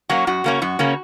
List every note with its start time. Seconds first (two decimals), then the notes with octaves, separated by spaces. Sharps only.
0.09 F#3 A#3 C#4 F#4
0.27 F#2 F#4
0.44 C#3 A#3 C#4
0.62 F#2 F#4
0.79 C#3 A#3 C#4